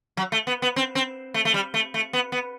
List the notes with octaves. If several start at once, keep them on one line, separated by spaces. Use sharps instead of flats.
F#3
A3
B3
B3
C4
C4
A3
A3
G3
A3
A3
B3
B3